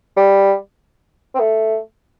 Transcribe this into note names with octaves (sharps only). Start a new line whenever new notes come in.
G3
C4
A3